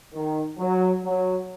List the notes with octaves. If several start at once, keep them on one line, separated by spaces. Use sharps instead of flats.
D#3
F#3
F#3